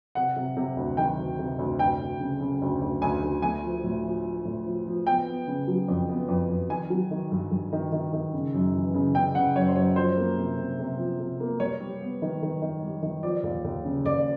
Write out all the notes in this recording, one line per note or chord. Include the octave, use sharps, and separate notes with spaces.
C3 F#5
C3
C3
D2
D#3 G5
D2
C3
D2
D2 G5
D2
C#3
C#3
D2
D2
D2 G#5
D2
A3 G#5
F3
A2
F3
F3
A2
F3
F3
B3 G5
B3
C#3
F#3
F2
B3
F2
F2
D#3 G#5
F#3
D#3
G2
G2
D#3
D#3
D#3
C#3
F#2
E3
C#3
C#3 G5
C#3 F#5
F#2 C#5
C5
F#2 C#5
F3 C5
A#3
C3
C3
C3
F3
C3
A#3
G3 C#5
G3
B3
D#3
D#3
D#3
G3
D#3
F3 D5
D#2
D#2
C#3
D#2 D5